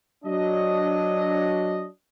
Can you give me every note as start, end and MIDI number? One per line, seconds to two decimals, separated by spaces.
0.25 1.86 54
0.25 1.86 62
0.25 1.86 75